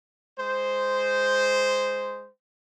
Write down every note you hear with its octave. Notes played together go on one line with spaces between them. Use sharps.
G#3 C5